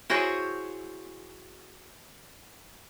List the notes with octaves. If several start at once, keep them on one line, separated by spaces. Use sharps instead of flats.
E4 F#4 G#4 C5 C#5